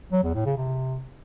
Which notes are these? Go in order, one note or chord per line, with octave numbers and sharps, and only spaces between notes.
F#3
E2
A2
C#3
C3